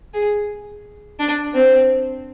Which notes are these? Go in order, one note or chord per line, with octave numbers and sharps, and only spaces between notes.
G#4
D4
C4